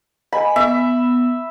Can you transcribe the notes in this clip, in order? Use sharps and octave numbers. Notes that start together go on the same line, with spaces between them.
D#5 G#5 B5
B3 E5